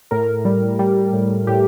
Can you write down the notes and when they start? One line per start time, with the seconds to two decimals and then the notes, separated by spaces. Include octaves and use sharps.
0.11 A2 A#4
0.45 G3
0.79 G3
1.13 A2
1.47 A2 G4